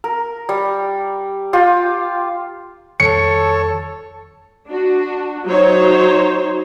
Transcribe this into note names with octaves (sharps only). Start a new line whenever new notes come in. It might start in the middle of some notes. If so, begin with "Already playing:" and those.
A#4
G3
F4 G4
F2 D#3 G3 A4 C#5 C#7
D4 F#4
F#3 D#4 C5 C#5